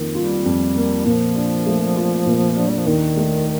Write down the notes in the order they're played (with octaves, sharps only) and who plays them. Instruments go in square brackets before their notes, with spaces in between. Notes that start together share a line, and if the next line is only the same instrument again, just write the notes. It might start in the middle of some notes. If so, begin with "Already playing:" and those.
Already playing: [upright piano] F2 D#3 A#3
[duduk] G3 [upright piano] F4
[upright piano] F2
A#3
[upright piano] A#2 [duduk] F3
[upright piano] D4
A3
F4
A#2
D4
[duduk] G3
F3
[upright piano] D#2 [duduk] D#3
[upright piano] A3